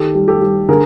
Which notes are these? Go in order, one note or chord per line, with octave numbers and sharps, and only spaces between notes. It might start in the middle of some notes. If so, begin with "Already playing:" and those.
Already playing: D#3 G4 A4
G3
G4 A4
G3
D3 G#4 A#4